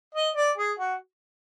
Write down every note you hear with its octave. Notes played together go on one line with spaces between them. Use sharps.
D#5
D5
G#4
F#4